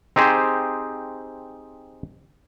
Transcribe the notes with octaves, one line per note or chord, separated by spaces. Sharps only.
C4 D#4 G4 G#4 C5